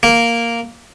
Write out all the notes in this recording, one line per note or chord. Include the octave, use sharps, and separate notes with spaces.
A#3